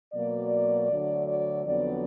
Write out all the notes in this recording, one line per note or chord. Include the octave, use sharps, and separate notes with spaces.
B2 F#3 A#3 D5
D2 D3 F#3
D5
F2 D3 F#3 B3 D5